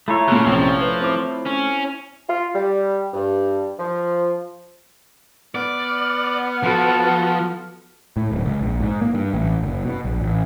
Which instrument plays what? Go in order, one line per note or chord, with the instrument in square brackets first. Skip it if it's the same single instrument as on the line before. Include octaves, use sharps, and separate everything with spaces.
[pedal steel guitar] A3 F4 C#5 [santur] E4 E5 A#5
[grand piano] A#2 A4 F#6 [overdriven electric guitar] C#3
[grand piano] A#1 C3 C#4 [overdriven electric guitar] F3
[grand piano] B4 C5
[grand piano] C4 D6 [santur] E4
[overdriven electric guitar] C#4
[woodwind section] F4
G3
G2
F3
[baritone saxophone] B3 [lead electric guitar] D5 [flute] F6
[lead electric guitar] F3 [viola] F#4 A4
[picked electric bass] A2
D1
C#2
A#1
G#2
A#3
G2
A1
F#1
B2
A#1
A1